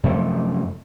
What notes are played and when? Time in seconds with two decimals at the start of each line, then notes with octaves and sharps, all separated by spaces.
0.03 F#2 C3 F3 A3